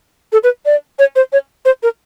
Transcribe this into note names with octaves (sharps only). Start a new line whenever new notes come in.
A4
B4
D5
C#5
C5
C#5
C5
A#4